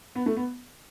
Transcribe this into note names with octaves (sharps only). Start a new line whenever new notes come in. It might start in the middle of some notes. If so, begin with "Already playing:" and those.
B3
A3
B3